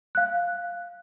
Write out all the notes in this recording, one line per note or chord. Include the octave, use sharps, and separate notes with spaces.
F5 F#6